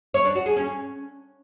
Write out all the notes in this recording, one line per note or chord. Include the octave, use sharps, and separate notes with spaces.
C#5
D4
F#4
G#4
C#4